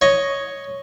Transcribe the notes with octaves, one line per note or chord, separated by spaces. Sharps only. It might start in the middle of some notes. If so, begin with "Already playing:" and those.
C#5 D#5